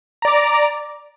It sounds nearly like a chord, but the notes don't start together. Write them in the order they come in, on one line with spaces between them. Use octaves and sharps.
A#5 D5 D6